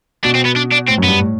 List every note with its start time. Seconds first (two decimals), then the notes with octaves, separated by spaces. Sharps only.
0.25 B2 D4
0.35 C4
0.45 B3
0.56 D4
0.72 D4
0.88 A2 C4
0.98 F#2
1.03 B3
1.08 G2
1.19 A2